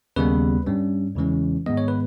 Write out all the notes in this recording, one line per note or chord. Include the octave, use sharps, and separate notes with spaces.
D#2 C#3 G3 B3 B4
G2 G3 C#4
E2 C#3 E3 G#3 C#4
G#2 D#3 G#3 B3 D#5
C#5
B4